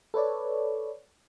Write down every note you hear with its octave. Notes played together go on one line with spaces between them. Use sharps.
A4 B4 C#5 D5